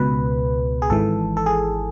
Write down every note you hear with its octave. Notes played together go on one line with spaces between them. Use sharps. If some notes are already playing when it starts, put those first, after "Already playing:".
Already playing: C#2 B2 B4
G#4
G#1 G#2 E3 A4
A4
G#4